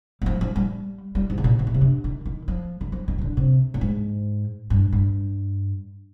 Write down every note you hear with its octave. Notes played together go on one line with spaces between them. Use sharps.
G3
F3
F3
G3
G3
G#2
C3
A#2
C3
A#2
C3
D3
D#3
D#3
F3
D#3
F3
D#3
D#3
D3
C3
A#2
G#2
G2
G2